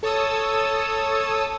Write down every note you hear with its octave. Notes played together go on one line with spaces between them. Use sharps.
A4 C#5 A5 D#6 E6